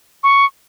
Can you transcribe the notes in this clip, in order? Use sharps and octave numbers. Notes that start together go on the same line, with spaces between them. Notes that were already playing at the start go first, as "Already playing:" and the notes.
C#6